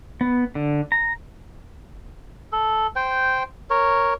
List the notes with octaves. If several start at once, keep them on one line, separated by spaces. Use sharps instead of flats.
B3
D3
A#5
A4
C5 G5
A#4 C#5